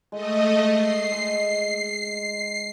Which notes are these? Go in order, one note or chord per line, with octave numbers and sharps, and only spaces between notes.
G#3 A3 D#5
C7
G#3